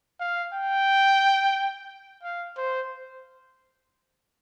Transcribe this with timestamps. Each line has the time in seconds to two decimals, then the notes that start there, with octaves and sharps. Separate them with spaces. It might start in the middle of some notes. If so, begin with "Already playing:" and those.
0.20 F5
0.53 G5
2.23 F5
2.57 C5